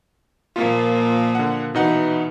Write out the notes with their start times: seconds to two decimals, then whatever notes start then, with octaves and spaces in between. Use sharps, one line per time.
0.56 A#2 F3 A#3 F4
1.35 D3 F#5
1.75 B2 E3 D#4 F#5